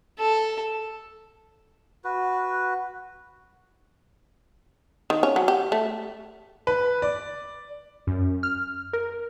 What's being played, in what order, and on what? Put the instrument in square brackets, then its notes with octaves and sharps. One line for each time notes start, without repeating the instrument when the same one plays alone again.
[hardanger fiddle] A4
[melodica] F#4 B4
[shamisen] D#3
C#4
F#3
G4
A3
[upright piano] B4
D5
[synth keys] F#2
F6
A#4